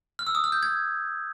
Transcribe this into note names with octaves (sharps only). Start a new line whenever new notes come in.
F6
E6
D#6
F6
G6
G#6